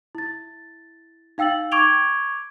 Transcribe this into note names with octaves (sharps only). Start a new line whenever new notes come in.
E4 A6
D#4 F5 G5 E6 A6 F#7
C#6 D6 G#6 D7 F7 G7